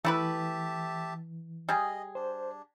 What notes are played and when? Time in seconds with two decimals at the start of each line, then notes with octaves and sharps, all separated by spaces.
0.05 E3 A3 E4 G4 B4 E5 A5
1.69 G3 G#4 D#5
2.15 D4 C5